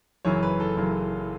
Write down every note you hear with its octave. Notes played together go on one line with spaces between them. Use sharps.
F#1 F#2 E3 C#5
B4
A4
F#1 F#2 E3